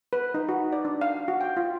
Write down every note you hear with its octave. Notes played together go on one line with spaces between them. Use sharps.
B4
D#4
F#4
D5
D4
F5
F#4
G5
F4